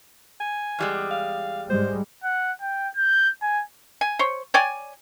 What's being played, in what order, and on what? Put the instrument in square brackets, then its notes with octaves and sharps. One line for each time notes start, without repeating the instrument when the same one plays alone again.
[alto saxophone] G#5
[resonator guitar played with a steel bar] E2 G3 G#3
[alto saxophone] F5
[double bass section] G#2 G3 G#3 [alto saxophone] C5
[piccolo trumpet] F#5
G5
G6
G#5
[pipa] G#5
C5 C#5
C#5 D5 G5 G#5